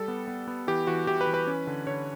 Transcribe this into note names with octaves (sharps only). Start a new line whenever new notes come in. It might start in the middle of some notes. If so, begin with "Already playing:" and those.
Already playing: G3 A4
B3
B3
B3
E3 G4
E3 F#4
E3 G4
B4
E3
B4
C#4
D3
D3 C#5